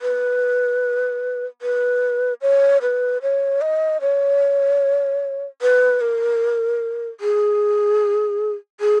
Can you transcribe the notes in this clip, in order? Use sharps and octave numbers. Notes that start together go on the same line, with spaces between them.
B4
B4
C#5
B4
C#5
D#5
C#5
B4
A#4
G#4
G#4